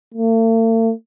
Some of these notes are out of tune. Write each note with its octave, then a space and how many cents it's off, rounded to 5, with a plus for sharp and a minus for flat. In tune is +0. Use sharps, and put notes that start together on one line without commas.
A3 +45